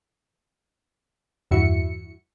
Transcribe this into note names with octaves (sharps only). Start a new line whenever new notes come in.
E2 G2 E4 F#4 E5 C#7